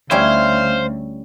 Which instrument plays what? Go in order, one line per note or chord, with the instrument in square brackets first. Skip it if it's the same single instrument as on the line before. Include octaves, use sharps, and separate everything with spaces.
[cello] D2 [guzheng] G3 C#4 E4 [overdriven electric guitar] C5 [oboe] F5